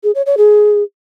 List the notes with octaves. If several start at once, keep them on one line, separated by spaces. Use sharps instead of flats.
G#4
C#5
C#5
G#4